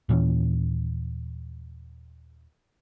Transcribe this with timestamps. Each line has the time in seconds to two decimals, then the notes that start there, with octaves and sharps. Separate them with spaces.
0.09 D#2 A#2 E3 C#4